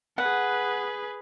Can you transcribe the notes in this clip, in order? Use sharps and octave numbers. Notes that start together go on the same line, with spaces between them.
G#4 B4 F#5